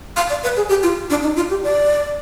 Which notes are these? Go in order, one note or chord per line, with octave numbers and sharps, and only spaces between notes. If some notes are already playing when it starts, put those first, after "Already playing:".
F5
D5
B4
G#4
G4
F4
D4
D#4
F4
G4
D5